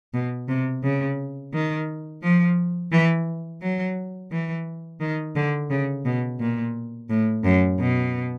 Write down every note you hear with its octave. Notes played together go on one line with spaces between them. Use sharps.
B2
C3
C#3
D#3
F3
E3
F#3
E3
D#3
D3
C#3
B2
A#2
A2
F#2
B2